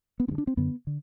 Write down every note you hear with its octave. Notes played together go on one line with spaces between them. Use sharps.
B3
G2 D3 C4
D4
C4
F#2 D3 B3
D3